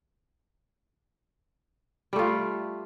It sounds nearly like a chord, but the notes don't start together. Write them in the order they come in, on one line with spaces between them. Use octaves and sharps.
G3 A3 F4